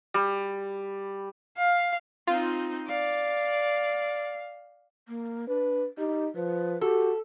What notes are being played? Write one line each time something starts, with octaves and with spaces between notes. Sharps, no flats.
G3
F5
C4 D#4 F4
D5 F5
A#3
D4 B4
D#4 G4
F3 B4
F#4 G4 A4